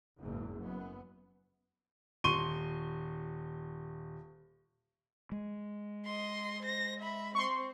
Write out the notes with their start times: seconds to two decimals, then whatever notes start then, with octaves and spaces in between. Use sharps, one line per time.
0.19 F#1 E2 G#2
0.60 F#2 B3
2.24 D#1 C6 C#6 D#7 G7
5.32 G#3
6.05 D#5 C6
6.62 C5 A#6
7.00 E5 B5
7.35 C4 C5 C6 C#6